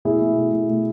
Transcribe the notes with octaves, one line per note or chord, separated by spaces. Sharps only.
B2 E4 G#4
B2
A3
B2
A3